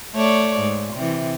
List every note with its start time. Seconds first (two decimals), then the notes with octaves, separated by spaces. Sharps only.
0.15 A3 C#5 D5
0.60 G#2
0.94 C3 E3